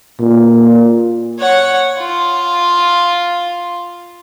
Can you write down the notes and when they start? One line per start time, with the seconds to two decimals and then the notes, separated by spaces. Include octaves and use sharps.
0.20 A#2
1.39 C#5 F#5
1.99 F4